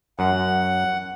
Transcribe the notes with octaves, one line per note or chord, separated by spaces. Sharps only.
F#2 F#5